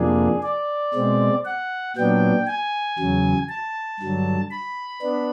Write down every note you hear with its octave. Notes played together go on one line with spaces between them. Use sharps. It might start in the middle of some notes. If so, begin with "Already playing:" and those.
Already playing: F2 C3 F3 A#3 D4 G#4
D5
B2 G#3 C4
F#5
A#2 F#3 B3 D4 G5
G#5
E2 C#3 F#3
A5
G2 D3 F#3
B5
B3 D4